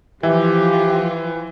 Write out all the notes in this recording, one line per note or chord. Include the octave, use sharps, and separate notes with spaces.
E3 F3 F4 G4 E5